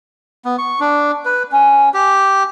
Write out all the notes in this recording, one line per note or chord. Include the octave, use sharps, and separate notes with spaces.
B3
C#6
D4
B4
C#4
G4